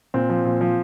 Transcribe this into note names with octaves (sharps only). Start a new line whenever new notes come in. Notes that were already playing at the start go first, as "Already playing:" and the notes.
A#2 C4
F3
A#2
F3